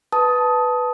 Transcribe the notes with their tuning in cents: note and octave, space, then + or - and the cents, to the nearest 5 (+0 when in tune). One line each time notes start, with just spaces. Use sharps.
B4 +0 A5 -5 D#6 +15